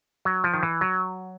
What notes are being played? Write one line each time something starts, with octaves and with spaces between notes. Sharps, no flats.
F#3
F3
D#3
E3
F#3